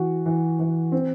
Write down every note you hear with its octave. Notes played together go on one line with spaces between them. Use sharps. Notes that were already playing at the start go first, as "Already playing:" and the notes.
Already playing: E3 F#4
E3
E3
C4